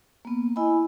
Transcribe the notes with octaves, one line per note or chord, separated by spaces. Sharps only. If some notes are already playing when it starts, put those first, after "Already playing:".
A#3 B3
E4 D#5 G#5 B5